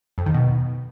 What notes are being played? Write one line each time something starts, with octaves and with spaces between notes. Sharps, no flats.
F2
D#3
B2